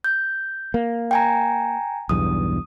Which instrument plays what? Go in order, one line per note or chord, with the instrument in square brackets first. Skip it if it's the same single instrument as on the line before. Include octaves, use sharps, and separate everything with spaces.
[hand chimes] G6
[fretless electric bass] A#3
[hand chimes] G5 G#5 A#5
[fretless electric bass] B1 E2 G2 [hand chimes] D#6